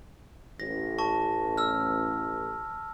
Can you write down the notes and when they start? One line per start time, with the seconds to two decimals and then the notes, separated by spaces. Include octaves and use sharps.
0.60 A1 A#6
0.98 A5 C#6
1.58 E6 F6